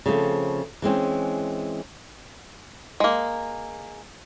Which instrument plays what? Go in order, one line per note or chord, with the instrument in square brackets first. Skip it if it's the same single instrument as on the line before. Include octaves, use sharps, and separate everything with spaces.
[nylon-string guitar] C#3 F3 A3 C4
E3 G#3 C4 C#4
[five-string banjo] G#3 A#3